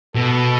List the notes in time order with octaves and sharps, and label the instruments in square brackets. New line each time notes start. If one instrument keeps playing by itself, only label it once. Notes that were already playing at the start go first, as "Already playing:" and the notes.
[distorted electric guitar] B2 [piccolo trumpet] A4